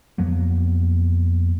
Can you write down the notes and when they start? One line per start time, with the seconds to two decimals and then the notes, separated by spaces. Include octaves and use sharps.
0.18 F2 F#3 A#3 B3